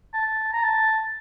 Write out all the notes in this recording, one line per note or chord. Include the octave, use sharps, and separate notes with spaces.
A5
A#5
A5